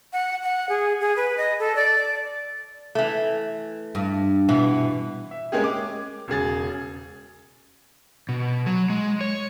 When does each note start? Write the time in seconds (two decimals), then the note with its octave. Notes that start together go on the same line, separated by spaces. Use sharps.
0.13 F#5
0.43 F#5
0.69 G#4
1.00 G#4
1.16 B4
1.37 D#5
1.59 A4
1.76 D5
2.95 E3 A3
3.95 G2
4.49 B2 E3
5.31 E5
5.52 G#3 A#3 C4 C#4 G4 G#4
5.64 D6
6.28 E1 C#3 G#4 A6
8.29 B2
8.66 F#3
8.90 G#3
9.21 C#5